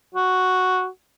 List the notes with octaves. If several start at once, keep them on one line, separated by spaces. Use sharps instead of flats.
F#4